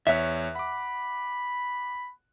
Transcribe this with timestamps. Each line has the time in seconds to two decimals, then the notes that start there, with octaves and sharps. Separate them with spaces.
0.07 E2 C#5 E5 F#6
0.55 F#5 B5 D6